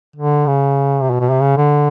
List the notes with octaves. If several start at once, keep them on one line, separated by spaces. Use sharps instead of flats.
D3
C#3
C3
B2
B2
C3
C#3
D3